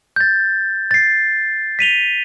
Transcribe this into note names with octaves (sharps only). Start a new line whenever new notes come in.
G6 A6
A6 C7
B6 D#7 F7 G7